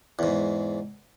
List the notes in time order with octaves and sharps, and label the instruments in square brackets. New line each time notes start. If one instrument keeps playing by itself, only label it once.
[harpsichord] E2 G#2